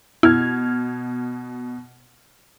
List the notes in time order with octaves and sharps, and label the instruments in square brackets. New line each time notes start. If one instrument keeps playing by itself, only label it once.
[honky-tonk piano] B2 F6 G#6 [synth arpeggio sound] E4